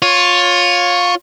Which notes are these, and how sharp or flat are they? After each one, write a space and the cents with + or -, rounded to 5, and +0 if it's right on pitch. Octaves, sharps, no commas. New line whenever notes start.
F4 +20 C#5 +0